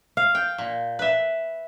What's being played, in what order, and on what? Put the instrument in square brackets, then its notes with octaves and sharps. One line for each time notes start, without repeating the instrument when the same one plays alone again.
[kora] F5
[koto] G5
A#2
B4 E5